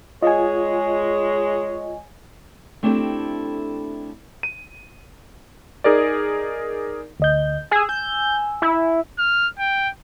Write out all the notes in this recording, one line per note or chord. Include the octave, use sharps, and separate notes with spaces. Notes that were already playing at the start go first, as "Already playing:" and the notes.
G#3 F4 C#5 D#5 G#5
A3 C4 D4 E4 G4 A4
D#7
D#4 G#4 A#4 D5
D2 D#5 G6
G#4 G#5 E6
G6
E4
F6
G5